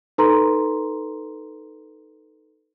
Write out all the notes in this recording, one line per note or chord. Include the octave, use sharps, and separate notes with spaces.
D#4 A4 B4 A#5 C6